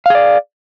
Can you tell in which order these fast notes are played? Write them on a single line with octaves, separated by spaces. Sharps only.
F5 G#4 D5